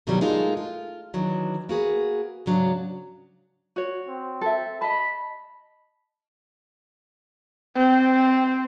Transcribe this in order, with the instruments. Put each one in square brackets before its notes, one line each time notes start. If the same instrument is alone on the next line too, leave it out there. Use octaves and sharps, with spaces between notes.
[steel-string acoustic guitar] G2 B2 D#3 E3 F#3 G3
G#3 A#3 D#4 F4 A4
F4
D#3 E3 F#3 D4
A#3 F#4 G#4 B4
G#2 C#3 F#3 D4
[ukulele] F#4 C#5
[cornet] C4
[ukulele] A4 E5
[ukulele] D#5 A5 [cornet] B5
[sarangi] C4